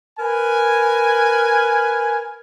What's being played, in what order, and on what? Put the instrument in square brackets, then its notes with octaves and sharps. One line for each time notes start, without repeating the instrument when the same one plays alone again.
[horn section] A#4 B4 G#5